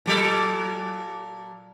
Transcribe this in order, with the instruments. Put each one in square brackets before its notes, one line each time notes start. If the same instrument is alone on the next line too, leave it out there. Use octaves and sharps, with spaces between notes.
[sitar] A#2 F#3 A4